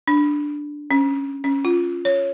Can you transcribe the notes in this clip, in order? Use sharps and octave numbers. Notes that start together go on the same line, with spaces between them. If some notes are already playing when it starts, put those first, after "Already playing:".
D4
C#4
C#4
F4
C#5